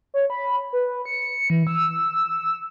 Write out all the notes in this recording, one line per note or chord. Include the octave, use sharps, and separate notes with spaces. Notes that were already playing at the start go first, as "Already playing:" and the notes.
C#5
B5
B4
C#7
E3
E6